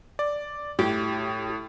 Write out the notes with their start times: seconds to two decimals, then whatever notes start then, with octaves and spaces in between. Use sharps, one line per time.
0.19 D5
0.79 A2 G4